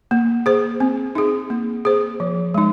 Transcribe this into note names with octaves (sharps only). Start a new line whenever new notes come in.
A#3
G#4 C5
C4
D#4 G#4
A#3
G#4 C5
F3
G#3 D#4